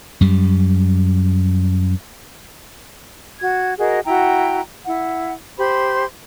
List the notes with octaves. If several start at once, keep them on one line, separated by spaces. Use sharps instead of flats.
F#2 G3
F#4 G#6
F#4 G#4 A#4 D#5
E4 F#4 G5 A#5
E4 F#5
G4 C5 B5 C6